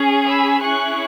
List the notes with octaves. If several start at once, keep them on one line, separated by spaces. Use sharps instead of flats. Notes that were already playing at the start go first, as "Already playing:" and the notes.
Already playing: C#4 G#4
B5 E6
C#4 E4 G#4 C#6 F#6